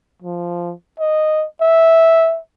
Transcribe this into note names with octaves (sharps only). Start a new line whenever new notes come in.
F3
D#5
E5